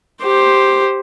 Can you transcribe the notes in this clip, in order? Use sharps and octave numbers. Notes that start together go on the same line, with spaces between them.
G4 C5